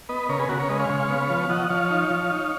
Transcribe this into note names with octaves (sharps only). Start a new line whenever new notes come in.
B3 B4 D#5
C#3 A#4 C#5
G#4 B4
C#3 F#4 A#4
A#4 C#5
G#3 B4 D#5
C#5 F5
C#3 C#5 F5
C#5 F5
B3
F3
F3 D#5 F#5
F3 C#5 F5
D#4
F3
D#4